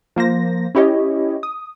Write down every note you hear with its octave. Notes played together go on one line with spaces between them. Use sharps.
F3 A#3 C5 A#6
C#4 E4 G4 C#5 D#5
D#6